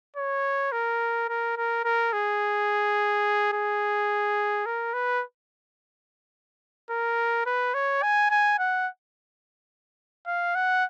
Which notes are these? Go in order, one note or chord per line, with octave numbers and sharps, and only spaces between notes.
C#5
A#4
A#4
A#4
A#4
G#4
G#4
A#4
B4
A#4
B4
C#5
G#5
G#5
F#5
F5
F#5